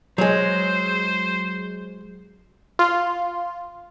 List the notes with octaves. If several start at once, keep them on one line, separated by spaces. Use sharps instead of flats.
F#3 G#3 C5
F4